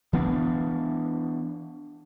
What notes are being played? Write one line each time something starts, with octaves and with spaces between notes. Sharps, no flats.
E3 B3 D4